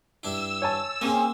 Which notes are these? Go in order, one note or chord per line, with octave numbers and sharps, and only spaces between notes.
G2 D4 E4 E6
C#5 G#5 A5
A#3 C4 C#4 G#4